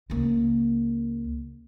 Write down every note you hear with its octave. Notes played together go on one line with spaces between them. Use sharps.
C#2 A#3